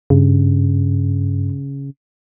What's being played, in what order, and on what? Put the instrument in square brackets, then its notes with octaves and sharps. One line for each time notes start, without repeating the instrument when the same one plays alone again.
[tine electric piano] G2 [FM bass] C#3